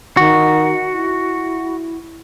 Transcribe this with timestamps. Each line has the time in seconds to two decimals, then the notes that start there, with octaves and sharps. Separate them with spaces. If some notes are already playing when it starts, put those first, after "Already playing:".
0.17 D#3 F#4
0.94 E4